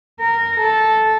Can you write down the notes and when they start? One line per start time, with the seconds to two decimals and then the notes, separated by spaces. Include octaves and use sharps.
0.20 A#4
0.60 A4